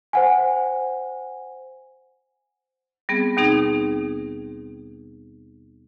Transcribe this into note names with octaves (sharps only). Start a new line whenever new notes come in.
C5 F#5 G#5
G3 B3 C4 G#4
D#2 B2 C4 D#4 G#4